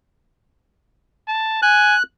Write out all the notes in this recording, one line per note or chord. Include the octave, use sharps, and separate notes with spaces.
A5
G#5 F#6